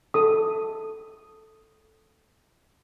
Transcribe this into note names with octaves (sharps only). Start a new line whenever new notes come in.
A4 D#6